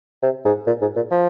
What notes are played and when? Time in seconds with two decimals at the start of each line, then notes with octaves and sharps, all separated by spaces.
0.22 C3
0.45 G#2
0.67 A#2
0.81 G#2
0.96 A#2
1.11 F3